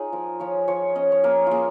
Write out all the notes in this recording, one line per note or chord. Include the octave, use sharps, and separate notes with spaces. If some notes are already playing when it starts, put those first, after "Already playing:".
Already playing: D#4 F4 G#4 C#5
F3 A#4
F3 C#5
F3 C#5
C#4 D#5
C#5
A#3 A#4
A#3 F4 G#4